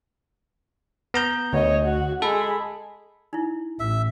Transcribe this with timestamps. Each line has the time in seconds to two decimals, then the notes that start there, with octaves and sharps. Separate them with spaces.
1.14 B3 A#5 G6
1.53 D2 C#5 D#5
1.85 F#4
2.22 G#3 A4 B5
3.33 D#4 E4
3.80 A1 E5